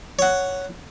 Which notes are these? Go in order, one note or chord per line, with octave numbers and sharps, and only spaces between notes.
C#5 F#5